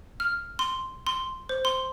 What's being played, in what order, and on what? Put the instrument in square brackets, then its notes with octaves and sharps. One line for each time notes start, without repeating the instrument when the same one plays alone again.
[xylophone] F6
C6
C6
C5
C6